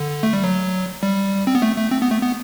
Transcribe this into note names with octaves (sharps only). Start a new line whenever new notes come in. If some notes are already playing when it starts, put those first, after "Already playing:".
Already playing: D3
A3
G3
F#3
G3
C4
B3
A3
A3
C4
B3
A3
B3